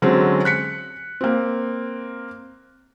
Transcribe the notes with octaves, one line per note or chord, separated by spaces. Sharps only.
D3 F#3 G#3 C4 C#4
F#6 B6 C#7
A#3 C4